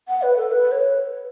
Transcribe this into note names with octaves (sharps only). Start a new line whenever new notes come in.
F#5
B4
A4
B4
C#5